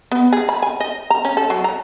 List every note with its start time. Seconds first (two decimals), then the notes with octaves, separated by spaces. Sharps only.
0.12 B3
0.33 G#4
0.49 B5
0.62 G#5
0.80 D#5
1.10 A#5
1.25 C#4
1.37 A4
1.50 F#3
1.64 A#5